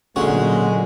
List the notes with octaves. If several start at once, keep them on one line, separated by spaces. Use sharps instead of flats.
A#2 D3 F#3 G#3 C#4 F#4